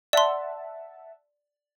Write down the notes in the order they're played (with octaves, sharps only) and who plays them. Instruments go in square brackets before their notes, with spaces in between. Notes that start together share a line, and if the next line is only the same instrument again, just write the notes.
[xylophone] D5 C6 [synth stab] E5 F#5 A5